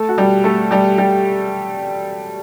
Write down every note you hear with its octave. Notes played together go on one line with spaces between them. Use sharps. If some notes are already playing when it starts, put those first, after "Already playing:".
Already playing: A3 A4
F#4
G3 G4
A3 A4
G3 G4
G3 G4